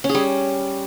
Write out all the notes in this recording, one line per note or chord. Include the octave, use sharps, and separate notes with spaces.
C#4
G#4
G3